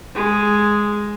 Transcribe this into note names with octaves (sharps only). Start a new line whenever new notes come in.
G#3